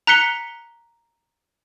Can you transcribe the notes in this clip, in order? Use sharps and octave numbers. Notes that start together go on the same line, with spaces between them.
A#5 F#6 B6 C#7 G7